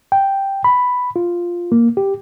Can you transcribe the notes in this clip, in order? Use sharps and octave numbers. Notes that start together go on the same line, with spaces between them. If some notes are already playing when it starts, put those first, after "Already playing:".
G5
B5
F4
A#3
G4